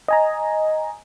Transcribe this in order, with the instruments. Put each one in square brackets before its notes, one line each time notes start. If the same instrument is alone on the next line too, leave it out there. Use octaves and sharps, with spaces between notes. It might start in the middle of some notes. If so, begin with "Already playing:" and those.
[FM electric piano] D#5 G#5 A#5